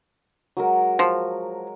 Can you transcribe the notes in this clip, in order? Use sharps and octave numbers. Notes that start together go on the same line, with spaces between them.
F#3 G#3 A#4
F3